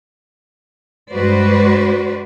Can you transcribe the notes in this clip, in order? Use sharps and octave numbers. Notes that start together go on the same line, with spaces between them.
G2 G#3 F#4 B4 C5 D5